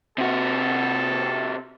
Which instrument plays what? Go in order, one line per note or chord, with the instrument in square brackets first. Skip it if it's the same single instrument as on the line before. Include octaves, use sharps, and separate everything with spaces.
[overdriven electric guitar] C3 F#4 [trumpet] A4